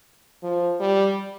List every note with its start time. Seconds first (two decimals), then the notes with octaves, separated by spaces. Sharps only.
0.43 F3
0.80 G3